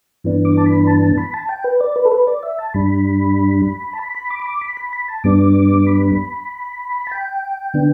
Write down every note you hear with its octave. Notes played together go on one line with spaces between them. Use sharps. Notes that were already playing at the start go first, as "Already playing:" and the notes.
G2 E3 B3 D4
D6
A5
B5
A5
A5
B5
A5
G5
B4
D5
B4
A4
B4
D5
E5
A5
G2 G3 D4 B5
A5
B5
B5
D6
B5
D6
B5
B5
B5
A5
G2 G3 B3 D4 D6
B5
A5
G5
D3 B3 D4